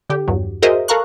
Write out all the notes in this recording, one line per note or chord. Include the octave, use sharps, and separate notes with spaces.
D3 G4
E2 G2 F#3
F#4 G#4 A#4 C5 D#5 E5
A4 A#4 F5 A#5 C#6 F#6